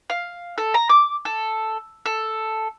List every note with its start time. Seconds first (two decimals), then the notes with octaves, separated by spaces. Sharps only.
0.10 F5
0.58 A4
0.74 A#5
0.89 D6
1.25 A4
2.06 A4